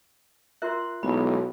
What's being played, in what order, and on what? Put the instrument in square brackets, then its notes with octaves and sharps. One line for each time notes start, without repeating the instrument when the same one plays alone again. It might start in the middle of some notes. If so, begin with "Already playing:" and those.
[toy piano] F4 A#4 E5 [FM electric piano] C6 F#6
[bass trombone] B1 [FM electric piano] G#3 B3 E4 [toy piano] B5